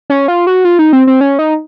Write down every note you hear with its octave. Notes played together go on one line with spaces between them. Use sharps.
C#4
F4
F#4
F4
D#4
C4
C4
C#4
D#4